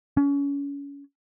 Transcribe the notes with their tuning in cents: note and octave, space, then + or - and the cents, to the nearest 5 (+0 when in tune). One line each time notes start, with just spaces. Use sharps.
C#4 +30